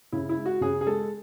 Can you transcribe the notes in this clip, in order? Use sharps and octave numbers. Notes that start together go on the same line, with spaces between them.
C#3 E4
E4
G#3
F#4
C#3 G#4
G#4
G#3 A4